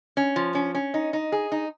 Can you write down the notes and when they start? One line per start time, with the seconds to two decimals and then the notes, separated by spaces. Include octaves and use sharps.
0.17 C#4
0.36 F3
0.55 C#4
0.75 C#4
0.94 D#4
1.13 D#4
1.32 G#4
1.52 D#4